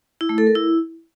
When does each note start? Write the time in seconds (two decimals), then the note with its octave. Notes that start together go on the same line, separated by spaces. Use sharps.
0.21 E4
0.29 A3
0.38 A4
0.47 A#4
0.55 E4